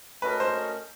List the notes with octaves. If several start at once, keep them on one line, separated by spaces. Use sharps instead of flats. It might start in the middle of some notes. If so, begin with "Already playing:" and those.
A3 C#4 F#4 A#4 B4 D#5
C5